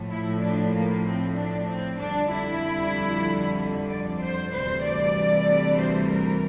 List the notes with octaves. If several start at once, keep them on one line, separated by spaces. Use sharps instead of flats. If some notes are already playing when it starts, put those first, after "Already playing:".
Already playing: A2 F3
E4
D4
A#3
C4
D4
C4
F2 D3 G3 D4
E4
D5
C5
D2 C3 E3 G3 C5
D5
C5
A#4